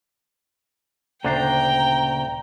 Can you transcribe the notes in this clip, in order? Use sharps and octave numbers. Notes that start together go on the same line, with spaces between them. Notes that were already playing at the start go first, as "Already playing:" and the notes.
D2 A#2 C#3 D4 C5 G5 A#5